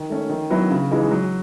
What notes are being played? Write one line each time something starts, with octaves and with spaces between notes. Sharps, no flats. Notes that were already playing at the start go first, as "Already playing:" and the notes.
Already playing: D#3
A3 C#4
D#3
F#3 B3 E4
C#3
E3 G#3 D#4
F#3